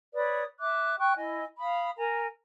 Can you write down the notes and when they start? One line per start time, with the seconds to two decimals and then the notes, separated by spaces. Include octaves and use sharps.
0.14 B4 C#5 D5 D#6
0.60 E5 D6 F#6
1.00 G5 C#6 F#6
1.17 E4 D#5 G#5
1.59 F5 B5 D#6
1.98 A#4 G#5 A#5